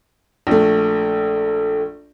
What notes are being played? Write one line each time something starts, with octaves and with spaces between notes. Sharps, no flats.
A#1 A3